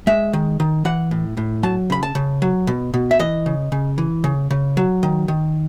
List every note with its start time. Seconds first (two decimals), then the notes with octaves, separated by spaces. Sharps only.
0.07 G#3 E5
0.33 D#3
0.60 D#3
0.85 E3 F#5
1.11 A2
1.37 A2
1.63 F#3 A5
1.90 C#3 B5
2.03 A5
2.15 C#3
2.42 F#3
2.67 B2
2.94 B2
3.11 E5
3.19 E3 D#5
3.46 C#3
3.72 C#3
3.98 E3
4.24 C#3
4.51 C#3
4.77 F#3
5.03 D#3
5.28 D#3